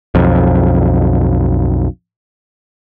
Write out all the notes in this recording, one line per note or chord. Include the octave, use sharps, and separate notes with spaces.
B1 F2